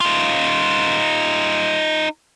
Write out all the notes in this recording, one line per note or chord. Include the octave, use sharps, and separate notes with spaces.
D#4 F4